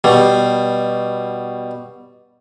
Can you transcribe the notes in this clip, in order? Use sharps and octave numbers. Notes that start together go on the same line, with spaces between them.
B2 G3